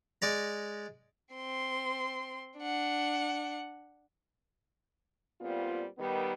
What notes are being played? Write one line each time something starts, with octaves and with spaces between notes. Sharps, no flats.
G#3 D5 A#5
C4 C6
D4 F#5
A#2 G3 B3 C4 F4
D#3 G3 B3